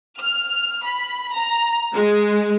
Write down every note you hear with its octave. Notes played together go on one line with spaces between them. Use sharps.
F6
B5
A#5
G#3